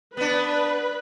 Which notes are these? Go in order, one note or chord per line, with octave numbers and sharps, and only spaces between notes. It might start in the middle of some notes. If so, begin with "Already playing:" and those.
B3 D4 B4